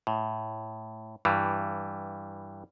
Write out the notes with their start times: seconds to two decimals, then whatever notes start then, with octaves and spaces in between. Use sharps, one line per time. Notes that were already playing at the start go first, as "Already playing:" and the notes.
0.07 A2
1.25 G2 E3 G3